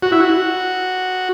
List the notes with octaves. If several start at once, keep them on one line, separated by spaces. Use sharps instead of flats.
F#4
E4
F#4